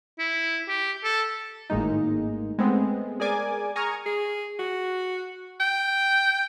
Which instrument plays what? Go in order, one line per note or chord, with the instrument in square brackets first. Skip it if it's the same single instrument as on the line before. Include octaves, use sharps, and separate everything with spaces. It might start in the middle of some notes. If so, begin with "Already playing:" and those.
[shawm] E4
G4
A4
[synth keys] G#1 A2 G#3 A#3 D#4
G#3 A3 B3 C4
G#4 A#4 D5 G#5 D6
G#5 A#5 C#6 D#6 F6 G#6
[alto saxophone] G#4
F#4
G5